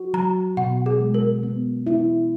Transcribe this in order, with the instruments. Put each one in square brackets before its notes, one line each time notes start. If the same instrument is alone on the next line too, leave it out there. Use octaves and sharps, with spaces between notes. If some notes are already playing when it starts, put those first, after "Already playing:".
Already playing: [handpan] F#4
[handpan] F#3 [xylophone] A#5
[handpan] B2 [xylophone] F#5
[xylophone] G#4
[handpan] G#3
[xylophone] A#4
[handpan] B3
E4